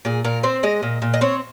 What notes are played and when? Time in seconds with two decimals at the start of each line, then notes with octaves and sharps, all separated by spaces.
0.05 A#2 G#4
0.24 A#2 A#4
0.43 C4 C5
0.63 G#3 D#5
0.83 A#2
1.02 A#2
1.14 D#5
1.21 C4 C#5